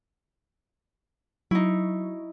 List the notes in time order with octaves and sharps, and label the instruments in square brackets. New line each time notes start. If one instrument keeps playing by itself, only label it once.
[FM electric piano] F#3 [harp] D#4 E4